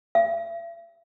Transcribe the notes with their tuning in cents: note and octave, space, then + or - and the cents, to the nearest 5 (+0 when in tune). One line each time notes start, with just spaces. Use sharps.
E5 +45